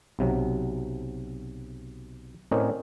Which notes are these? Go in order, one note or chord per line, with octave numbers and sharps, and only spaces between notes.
B1 C3 F#3
A2 C4 C#4 A#4 D5 D#5